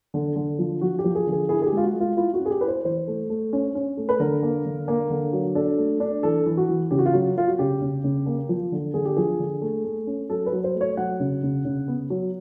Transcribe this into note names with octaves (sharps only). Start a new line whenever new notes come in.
D3
D3
F3
F3 F#4
G4
F3
G#4
D3
G#4
E4 G#4
G#4
G4
G#3
F4
F#4
G#3
F4
E4 F4
F#4
C#4
G#4
G4
E4 B4
C5
E3 C5
A3
A3
C#4
C#4
A3
B4
D3 A#4
A#3
D3
A#3
D3
F#3
D4 A4
A3
D4
E3 A4
E3
F#4
E3
C#3 G4
F#4
F4
F#3 F#4
F#3 F4
F#4
C#3 G4
C#3
C#3
A#3
F3
D3
D3 G#4
G4
F3 G#4
D3
A3
A3
C#4
F#3 A4
B4
F#3
C5
A3
C#5
F#3 F#5
C#3
C#3
C#3
B3
F#3